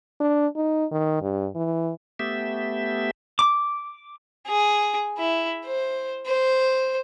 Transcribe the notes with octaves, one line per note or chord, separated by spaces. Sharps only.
D4
D#4
D#3
G2
E3
A3 B3 G4 E5
D6
G#4
E4
C5
C5